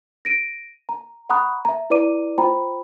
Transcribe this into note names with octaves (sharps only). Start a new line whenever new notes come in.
A#6 D7 D#7
A#5
F#5 A#5 B5 C#6 D#6 F#6
E5 A#5
E4 B4 D5 A#5 D6 D#7
F4 C5 G5 A#5 B5